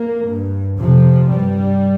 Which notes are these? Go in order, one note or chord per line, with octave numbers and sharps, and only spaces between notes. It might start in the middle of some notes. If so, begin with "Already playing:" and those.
Already playing: A#3
G2
F2 C3 F3
G2 G3